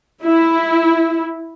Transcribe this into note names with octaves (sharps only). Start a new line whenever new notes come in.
E4